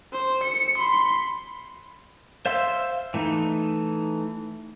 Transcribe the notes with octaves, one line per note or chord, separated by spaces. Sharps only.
C5
C#7
B5 C6
C5 E5 F5 C6 E6
E3 A3 D#4